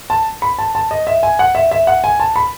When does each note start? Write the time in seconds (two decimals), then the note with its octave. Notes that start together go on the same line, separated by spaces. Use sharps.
0.10 A5
0.42 B5
0.59 A5
0.75 A5
0.91 D#5
1.07 E5
1.23 G#5
1.39 F#5
1.55 E5
1.71 E5
1.87 F#5
2.04 G#5
2.20 A5
2.36 B5